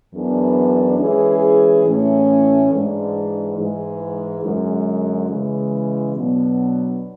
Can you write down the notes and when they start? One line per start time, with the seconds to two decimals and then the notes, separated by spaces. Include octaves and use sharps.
0.13 F#2 E3 B3 D4 G#4
0.98 E3 G#3 C#4 G#4
1.85 A2 E3 A3 C#4
2.71 G#2 E3 G#3 D4
3.57 G#2 E3 G#3
4.43 F#2 D3 G#3
5.29 C#3 E3 G#3
6.15 B2 F#3 B3 D4